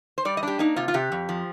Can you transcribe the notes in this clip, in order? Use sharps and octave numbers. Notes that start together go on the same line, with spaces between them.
C5
G3 D5
D#5
D4 G4
A#3 D#4
C3 F4
F4
C3 G4
F2
F3